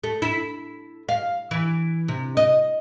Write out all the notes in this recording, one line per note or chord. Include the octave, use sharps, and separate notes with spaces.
A3
E4
F5
E3
C3
D#5